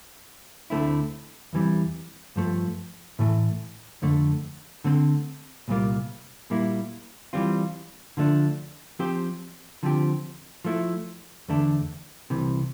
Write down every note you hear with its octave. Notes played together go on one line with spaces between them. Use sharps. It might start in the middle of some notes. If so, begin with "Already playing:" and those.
D2 D3 A3 C4 E4
E2 E3 G3 C4
G2 F3 A3
A2 E3 A3
F2 D3 A3
D3 A3 C4
C2 A#2 G3 A#3 F4
A#2 G3 A#3 E4
E3 G3 C4 F4
D3 F3 A3 D4
F3 C4 G4 C5
D3 F3 C4 G4
F3 A3 E4
E2 D3 A3 D4
C2 C3 E3